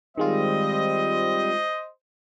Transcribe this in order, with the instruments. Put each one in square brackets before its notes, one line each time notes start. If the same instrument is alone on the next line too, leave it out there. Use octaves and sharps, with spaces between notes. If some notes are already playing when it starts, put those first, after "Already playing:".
[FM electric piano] D#3 G#3 F4 [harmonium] G3 C4 [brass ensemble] C5 D#5